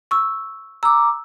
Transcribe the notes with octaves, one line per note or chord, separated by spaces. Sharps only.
C#6 E6
A#5 D6 E6